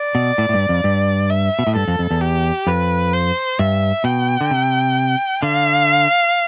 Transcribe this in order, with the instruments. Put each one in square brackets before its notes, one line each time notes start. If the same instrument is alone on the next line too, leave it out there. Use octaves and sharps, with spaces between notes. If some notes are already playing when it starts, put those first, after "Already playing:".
Already playing: [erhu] D5
[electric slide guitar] B2
A2
A2
G2
F2
G2
[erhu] E5
[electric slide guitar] B2
A2
[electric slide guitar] G2 [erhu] A4
[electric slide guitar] F2
F2
E2
[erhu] G4
[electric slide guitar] F2 [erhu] B4
[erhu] C5
[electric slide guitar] G2 [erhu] E5
[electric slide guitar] B2 [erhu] G5
[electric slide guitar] D3
C3
[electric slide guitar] D3 [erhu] F5